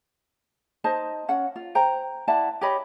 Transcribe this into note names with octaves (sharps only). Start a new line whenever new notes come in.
D#4 C5 D#5 A5
C#4 F#5
F4
C5 G5 A#5
E4 D5 F#5 A5
G4 C#5 D#5 B5